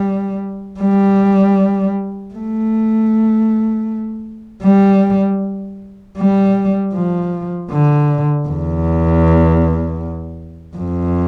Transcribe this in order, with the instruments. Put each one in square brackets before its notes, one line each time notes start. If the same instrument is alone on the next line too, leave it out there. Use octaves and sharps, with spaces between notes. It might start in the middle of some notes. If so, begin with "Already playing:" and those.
Already playing: [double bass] G3
G3
A3
G3
G3
F3
D3
E2
F2